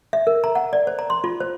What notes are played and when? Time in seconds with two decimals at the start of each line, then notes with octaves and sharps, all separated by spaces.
0.13 E5
0.27 A#4
0.44 A#5
0.55 F#5
0.73 D5
0.87 C5
0.99 A#5
1.10 C6
1.24 F4
1.40 C5